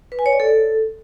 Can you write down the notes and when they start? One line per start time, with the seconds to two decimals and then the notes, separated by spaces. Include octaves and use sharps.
0.12 B4
0.19 G#5
0.26 C#5
0.33 D5
0.40 A4